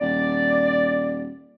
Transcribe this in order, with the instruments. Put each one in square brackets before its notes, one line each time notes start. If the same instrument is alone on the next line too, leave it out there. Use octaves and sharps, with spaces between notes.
[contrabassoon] D#1 [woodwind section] D5